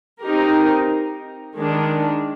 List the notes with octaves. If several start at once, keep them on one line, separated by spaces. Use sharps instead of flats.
C4 D#4 G4 A#4
D#3 G#3 D4